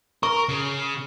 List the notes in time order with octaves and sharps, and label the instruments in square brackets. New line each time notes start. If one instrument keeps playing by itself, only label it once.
[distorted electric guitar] A#4 [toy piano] C#6
[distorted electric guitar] C#3